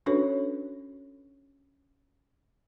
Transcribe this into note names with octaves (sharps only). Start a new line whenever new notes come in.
C#4 D4 F#4 A4 B4 C#5